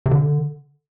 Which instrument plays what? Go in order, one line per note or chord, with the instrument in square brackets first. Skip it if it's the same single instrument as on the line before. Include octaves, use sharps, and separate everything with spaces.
[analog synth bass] C3
D3